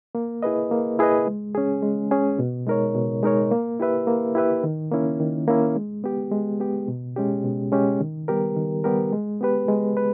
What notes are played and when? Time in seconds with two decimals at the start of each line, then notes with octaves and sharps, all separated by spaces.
0.15 A#3
0.43 E4 G#4 B4 D#5
0.71 A#3
0.99 E4 G#4 B4 D#5
1.27 G#3
1.55 C#4 G#4
1.83 G#3
2.11 C#4 G#4
2.39 B2
2.67 G#3 D#4 A#4 C#5
2.95 B2
3.23 G#3 D#4 A#4 C#5
3.51 A#3
3.80 E4 G4 B4 E5
4.07 A#3
4.35 E4 G4 B4 E5
4.63 D#3
4.92 A#3 C#4 E4
5.20 D#3
5.48 A#3 C#4 E4
5.75 G#3
6.04 B3 G4
6.32 G#3
6.60 B3 G4
6.88 B2
7.16 G#3 C#4 G4
7.44 B2
7.72 G#3 C#4 G4
8.00 D#3
8.28 G3 B3 G4 A#4
8.56 D#3
8.84 G3 B3 G4 A#4
9.12 G#3
9.41 B3 G4 B4
9.68 G#3
9.97 B4